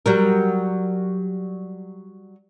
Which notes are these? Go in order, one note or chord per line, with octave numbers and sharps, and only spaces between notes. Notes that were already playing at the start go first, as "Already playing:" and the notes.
F#3 G3 A#4